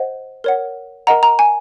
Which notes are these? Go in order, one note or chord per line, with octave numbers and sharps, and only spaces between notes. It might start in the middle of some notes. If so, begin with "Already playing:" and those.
Already playing: C5 D#5 F#5
A#4 C#5 F#5
A#4 D#5 F#5 A#5
A#5
G#5